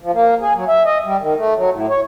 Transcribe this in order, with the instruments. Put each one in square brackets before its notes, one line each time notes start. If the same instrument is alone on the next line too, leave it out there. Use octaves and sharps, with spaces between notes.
[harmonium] F3
A#3
G#4
F#3
E5
D#5
G3
D#3
A3
F#3
A2
C#5